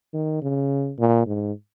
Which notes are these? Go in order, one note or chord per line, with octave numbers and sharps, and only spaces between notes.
D#3
C#3
A#2
G#2